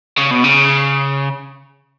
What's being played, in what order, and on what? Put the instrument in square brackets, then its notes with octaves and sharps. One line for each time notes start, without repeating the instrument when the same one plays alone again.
[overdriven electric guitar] C#3
B2
C#3